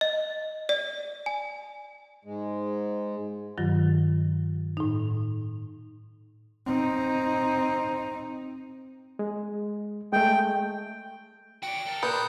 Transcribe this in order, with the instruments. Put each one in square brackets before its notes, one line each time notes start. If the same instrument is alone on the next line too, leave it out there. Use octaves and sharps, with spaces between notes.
[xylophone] D#5
D5
G#5
[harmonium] G#2 G#3
[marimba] G2 D#3 F#3 F4
A2 D#4
[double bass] C4 D#4
[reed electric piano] G#3
[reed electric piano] G#3 A3 [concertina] G5
[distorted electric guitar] F#4 D5 [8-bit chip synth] G5
[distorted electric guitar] A4 A#4
[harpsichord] A#2 [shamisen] B4 [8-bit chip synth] D#6 F#6 G6